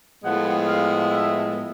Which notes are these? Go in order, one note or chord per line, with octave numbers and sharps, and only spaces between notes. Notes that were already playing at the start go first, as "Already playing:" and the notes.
A2 F3 G#3 B3 F#5
F5
E5